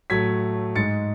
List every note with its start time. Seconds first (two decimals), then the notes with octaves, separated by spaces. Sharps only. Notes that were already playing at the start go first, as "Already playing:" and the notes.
0.10 A2 F#3 A3 G#6 B6
0.76 G#2 G#3 A6 C#7